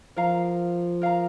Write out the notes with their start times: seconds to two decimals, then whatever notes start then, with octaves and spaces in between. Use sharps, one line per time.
0.16 F3 A#4 F5 A#5
1.02 A#4 F5 A#5